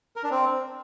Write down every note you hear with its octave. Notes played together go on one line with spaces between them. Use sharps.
A#4
D4
C4